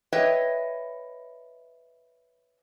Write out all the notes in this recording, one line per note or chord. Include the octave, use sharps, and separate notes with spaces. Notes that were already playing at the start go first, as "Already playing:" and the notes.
B4 C#5 D#5 E5 G5